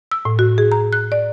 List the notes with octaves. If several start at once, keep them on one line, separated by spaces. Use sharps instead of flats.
E6
A2
F#4
G#4
A#5
F#6
D5